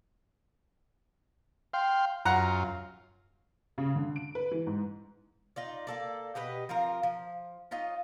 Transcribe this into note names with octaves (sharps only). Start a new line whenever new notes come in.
F5 G5 C6
F#2 F4 F#5 A#5
C#3
D3
D7
B4
E3
G#2
D#4 F4 D5
A#3 A4 D5
B2 G4 B4 D#5
F3 C4 F4 A#4
F3
C#4 D#4 F4 D#5